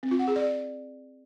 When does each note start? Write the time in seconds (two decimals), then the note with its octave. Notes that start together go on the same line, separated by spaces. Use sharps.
0.03 C4
0.11 F4
0.19 F#5
0.28 G#4
0.36 D5